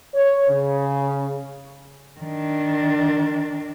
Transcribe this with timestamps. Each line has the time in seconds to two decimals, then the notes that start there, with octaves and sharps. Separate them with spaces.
0.15 C#5
0.49 C#3
2.20 D#3 D4